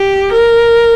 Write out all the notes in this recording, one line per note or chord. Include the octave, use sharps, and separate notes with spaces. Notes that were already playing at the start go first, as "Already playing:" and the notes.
Already playing: G4
A#4